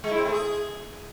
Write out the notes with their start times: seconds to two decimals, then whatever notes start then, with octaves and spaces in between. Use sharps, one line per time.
0.04 G#3
0.11 E4
0.18 C4
0.25 A3
0.33 G#4